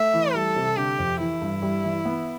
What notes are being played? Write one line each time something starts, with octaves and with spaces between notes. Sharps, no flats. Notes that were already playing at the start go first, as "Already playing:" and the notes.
Already playing: A3 E5
E3
G3 A4
C3
D3 G4
F2
E3 E4
G2
G3
E3
B3